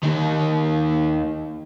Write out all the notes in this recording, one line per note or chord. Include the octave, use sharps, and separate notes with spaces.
D#2 D#3